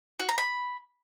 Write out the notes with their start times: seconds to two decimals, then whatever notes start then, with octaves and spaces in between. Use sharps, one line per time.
0.19 F#4
0.29 A#5
0.38 B5